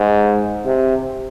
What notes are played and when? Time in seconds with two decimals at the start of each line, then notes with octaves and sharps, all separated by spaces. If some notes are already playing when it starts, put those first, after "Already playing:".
Already playing: G#2
0.66 C3